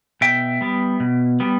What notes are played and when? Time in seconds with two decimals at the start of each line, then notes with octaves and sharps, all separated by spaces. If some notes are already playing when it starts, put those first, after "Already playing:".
0.21 B2 E5 G5
0.61 G3 B3
1.00 B2
1.40 G3 B3